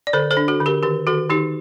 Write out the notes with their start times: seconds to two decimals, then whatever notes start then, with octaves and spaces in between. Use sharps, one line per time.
0.07 D5
0.13 D3 A4 C5
0.31 A4 C5
0.37 D4
0.48 F#4 A4
0.60 D3
0.66 G4 A#4
0.83 D#3 G4 A#4
1.07 D#3 F#4 A4
1.29 D#3 D#4 G4